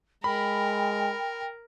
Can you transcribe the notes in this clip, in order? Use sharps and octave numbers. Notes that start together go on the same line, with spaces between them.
G#3 A#4 G5 B5